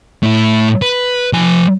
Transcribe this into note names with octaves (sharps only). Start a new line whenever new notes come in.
A2 E4
B4
F3 G#5